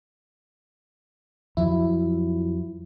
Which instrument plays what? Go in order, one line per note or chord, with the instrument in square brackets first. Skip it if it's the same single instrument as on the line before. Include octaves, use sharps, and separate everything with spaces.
[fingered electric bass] F2 F3 F#3 [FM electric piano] E4